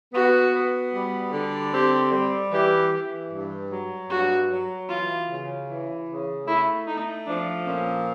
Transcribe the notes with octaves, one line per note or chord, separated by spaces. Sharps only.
B3 F#4
B3
G3
D3
C4 G4
G3
E3 G4
E3
G2
F#3
G2 F#4
F#3
E3 F4
C#3
E3
C#3
A3 E4
A3 D#4
F3 D4
A#2 C#4